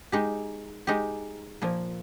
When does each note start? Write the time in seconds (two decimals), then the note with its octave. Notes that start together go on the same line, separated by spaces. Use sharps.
0.12 G#3 D#4 G4
0.87 G#3 D#4 G4
1.62 A#2 F3 A#3